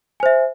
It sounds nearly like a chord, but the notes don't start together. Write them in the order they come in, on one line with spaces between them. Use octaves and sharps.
G#5 C5 E5